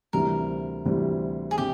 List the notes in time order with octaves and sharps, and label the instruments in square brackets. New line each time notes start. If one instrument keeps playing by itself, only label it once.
[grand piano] D2 C3 E3 G3 [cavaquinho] A#4
[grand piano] D2 C3 E3 G3
[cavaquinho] G#4
[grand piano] C3 [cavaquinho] G4